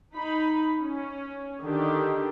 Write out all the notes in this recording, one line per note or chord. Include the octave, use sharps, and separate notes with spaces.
D#4 B5
C#4
D3 D#3 D4 G4